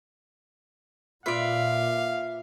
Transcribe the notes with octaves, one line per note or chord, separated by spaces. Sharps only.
A#2 F4 B4 D5 E5 F5